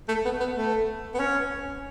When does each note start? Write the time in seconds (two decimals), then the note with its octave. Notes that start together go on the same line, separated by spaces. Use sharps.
0.09 A3
0.25 B3
0.40 B3
0.56 A3
1.15 B3
1.20 C#4